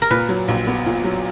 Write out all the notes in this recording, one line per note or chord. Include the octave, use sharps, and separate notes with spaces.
A#4
A#2 B4
F#3
A#1
B3
A#2
F#3